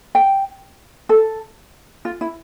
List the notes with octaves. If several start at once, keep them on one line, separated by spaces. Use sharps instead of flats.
G5
A4
F4
E4